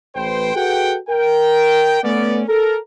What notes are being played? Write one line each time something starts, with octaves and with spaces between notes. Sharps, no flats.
A1 B4 C5 G5
F#4 G#4 A4 B4 F#5 G5
A#4 G5
A3 B3 C#4 D5
A4 A#4